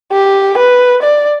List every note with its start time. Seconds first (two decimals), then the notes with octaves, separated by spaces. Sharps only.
0.12 G4
0.58 B4
1.02 D5